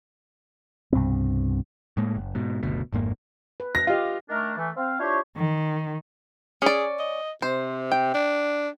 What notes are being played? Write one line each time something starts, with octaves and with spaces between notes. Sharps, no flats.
C2 G2 B2 C4
A2 G#3 A#3
F#1
G#2 B2
F#1 D2 B2
G#1 F2 G#2 A#3
B4
A#6
F4 G4 D#5 F5
D#3 A3 D4 A#4
E3 A3
C4 F5
D4 E4 F4 G4 C5 C#5
D#3
C#4 G#4 D5
D#5
C3 C5
G5
D4